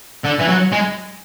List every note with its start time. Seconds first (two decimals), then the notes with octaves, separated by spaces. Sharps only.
0.24 D3
0.39 E3
0.48 F#3
0.72 G#3